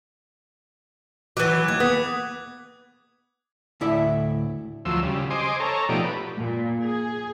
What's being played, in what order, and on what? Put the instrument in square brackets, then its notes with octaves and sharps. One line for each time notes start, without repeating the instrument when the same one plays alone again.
[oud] E3 F#3 [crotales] D6 F#6
[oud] D#2 [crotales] G#6
[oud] B3 [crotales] D#6
[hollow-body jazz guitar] D2 A2 E4 A4 D5 E5
[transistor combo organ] D2 F3 F#3 C6 E6
C#3 G3
C5 D#5 G#5 C6 D6
A4 C#5 A#5
B2 F3 A3 D#4 G4 D5
B4
[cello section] A#2
G#4